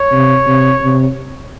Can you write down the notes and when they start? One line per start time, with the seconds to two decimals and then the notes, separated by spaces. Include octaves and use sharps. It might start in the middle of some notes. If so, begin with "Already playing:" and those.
Already playing: C#5
0.13 C3
0.47 C3
0.82 C3